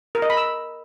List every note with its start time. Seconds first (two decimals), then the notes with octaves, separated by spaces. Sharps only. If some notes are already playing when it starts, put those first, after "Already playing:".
0.15 A#4
0.22 D#5
0.30 B5
0.37 E6